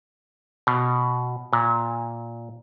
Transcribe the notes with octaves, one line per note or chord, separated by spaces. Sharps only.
B2
A#2